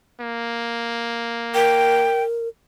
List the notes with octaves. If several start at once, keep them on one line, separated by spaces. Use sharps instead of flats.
A#3
A#4 G5